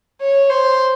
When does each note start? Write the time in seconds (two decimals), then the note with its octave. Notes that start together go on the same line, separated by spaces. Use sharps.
0.21 C#5
0.49 C5